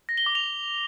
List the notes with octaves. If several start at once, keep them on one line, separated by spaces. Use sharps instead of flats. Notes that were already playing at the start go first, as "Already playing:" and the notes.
A#6
G7
D6
F7